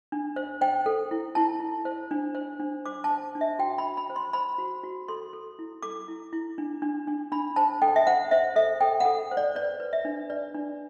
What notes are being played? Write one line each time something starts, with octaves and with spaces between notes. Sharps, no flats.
D4
C5
C5 G5
A4
E4
E4 A5
E4
C5
D4
C5
D4
C5 D6
A5
C5
D4
E5
F#4 G5
B5
F#4
B5
C5
C6
C5 B5
F#4
F#4
A4 C6
A4
E4
A4 D6
E4
E4
D4
D4
D4
D4 B5
C5 A5
A4 G5
E5
C5 F#5
C5 E5
A4 E5
A4 G5
F#5
A4
C5
D5
B4 D5
B4
E5
D4
B4 D5
D4